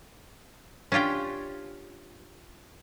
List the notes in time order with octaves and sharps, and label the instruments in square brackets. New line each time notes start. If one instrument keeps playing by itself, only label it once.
[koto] C#4 D4 F4 G4 G5